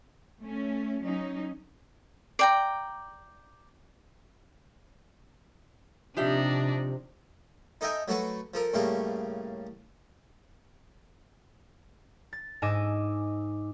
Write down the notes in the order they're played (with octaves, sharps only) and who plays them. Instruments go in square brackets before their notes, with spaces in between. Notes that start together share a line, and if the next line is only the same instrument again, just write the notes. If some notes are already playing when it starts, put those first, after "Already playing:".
[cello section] A3 C#4
F#3 C#4 D#4
[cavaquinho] D5 G5 A#5
[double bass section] C3 [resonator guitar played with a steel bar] F3 G4 E5 [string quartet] D4 D#4
[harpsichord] D#4 A4 D#5 E5 G5 G#5
F#3 A3 F#4 A4 B4
F3 A4 A#4
A2 C#3 G3 A3 A#3
[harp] A6
G#2 D#5 G#5 D6 E6 E7